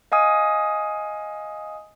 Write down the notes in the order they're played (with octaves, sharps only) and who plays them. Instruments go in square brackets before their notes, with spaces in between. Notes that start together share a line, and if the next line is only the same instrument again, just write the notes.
[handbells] D#5 F5 G#5 D#6